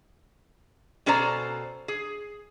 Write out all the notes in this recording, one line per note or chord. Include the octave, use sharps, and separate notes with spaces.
B2 C#4 A4 C5 D5 A#5
G#4